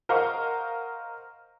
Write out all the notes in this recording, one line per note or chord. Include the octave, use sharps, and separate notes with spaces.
A#4 C5 D#5 F5 F#5 C#6